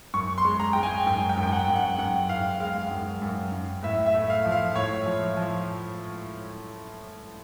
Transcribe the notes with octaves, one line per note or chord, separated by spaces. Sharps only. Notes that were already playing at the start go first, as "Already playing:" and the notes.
F#2 C#6
C6
G#3
A#5
G#3 G5
G#5
F#2 G5
G5
F#2
G5
F#5
F#2
F#5
F#2 F#5
F#2 F5
G#3 F5
F#2
F#2
F#2
A2 E5
E5
A3
F5
F3
F5
A2 C#5
F3
F3